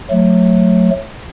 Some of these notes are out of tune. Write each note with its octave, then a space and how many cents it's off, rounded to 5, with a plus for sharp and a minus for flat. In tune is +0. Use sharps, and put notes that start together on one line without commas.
F#3 -20 A3 +0